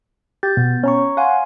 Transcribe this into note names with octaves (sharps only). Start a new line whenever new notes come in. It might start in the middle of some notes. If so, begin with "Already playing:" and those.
G4 G6 A6
B2 B3
C#4 C#5 A#5 C#6
F5 F#5 G#5 C6